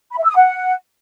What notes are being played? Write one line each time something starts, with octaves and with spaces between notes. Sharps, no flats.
B5
E5
E6
D#6
F#5